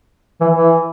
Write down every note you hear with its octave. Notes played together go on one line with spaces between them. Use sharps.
E3
E3